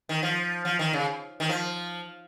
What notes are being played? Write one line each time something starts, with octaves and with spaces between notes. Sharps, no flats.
D#3
F3
F3
D#3
C#3
D#3
F3